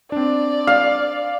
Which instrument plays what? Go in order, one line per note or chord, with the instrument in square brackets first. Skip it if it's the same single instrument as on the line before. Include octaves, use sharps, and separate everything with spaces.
[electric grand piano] C4 D4 [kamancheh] D5
[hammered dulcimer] F5